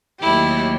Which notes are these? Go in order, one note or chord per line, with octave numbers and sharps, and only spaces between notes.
D#2 D#3 F#3 A3 E4 G4